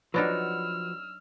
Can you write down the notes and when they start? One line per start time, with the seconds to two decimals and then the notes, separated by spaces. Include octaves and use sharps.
0.14 F3 F#3 D4 D#4 F#4 B4 E6 F6